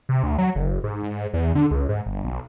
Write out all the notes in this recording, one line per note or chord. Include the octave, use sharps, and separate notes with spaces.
C3
D2
F#3
F#1
G#2
G#2
E2
D3
C#2
G#2
G1
B1